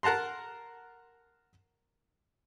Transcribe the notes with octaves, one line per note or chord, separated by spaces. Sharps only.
A#4 F#5 A5 A#5 C6